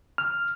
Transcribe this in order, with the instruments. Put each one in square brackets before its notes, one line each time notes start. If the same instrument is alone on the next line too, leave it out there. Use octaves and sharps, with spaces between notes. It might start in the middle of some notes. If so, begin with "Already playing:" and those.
[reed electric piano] F6